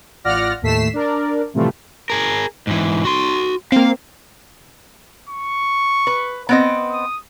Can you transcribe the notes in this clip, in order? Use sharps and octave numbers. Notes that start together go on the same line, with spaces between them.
A1 F4 D5 F#5 F6 A#6
D#2 A2 A3 B6 C7 E7
D4 A#4 D5
A2 C3 E3 F3 G3 A3
G#4 A#4
G#2 E3
F#4 C6
A#3 C4 F5
C#6
B4
B3 C4 D#5
D#6